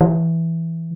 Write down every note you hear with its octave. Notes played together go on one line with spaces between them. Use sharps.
E3